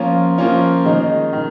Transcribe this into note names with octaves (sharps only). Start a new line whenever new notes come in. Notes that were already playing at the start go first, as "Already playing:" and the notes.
Already playing: F3 A#3 C#4 F4
F3 A#3 C#4 F4
D#3 G#3 D#4
D#3